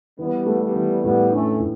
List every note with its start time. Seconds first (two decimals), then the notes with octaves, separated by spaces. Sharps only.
0.19 E3 G3 B3
0.46 A3
0.61 G3 B3
0.75 E3
1.03 A2 G3 B3
1.31 A3 C#4 D4
1.60 A2